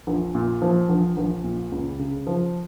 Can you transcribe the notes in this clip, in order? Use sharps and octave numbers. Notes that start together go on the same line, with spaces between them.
A#1
A#2
F3
A#1
A#1
A#2
C#2
C#3
F3